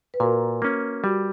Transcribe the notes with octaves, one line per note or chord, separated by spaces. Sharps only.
B4
A#2 F#4 A#4
A#3 C#4
G3 F#4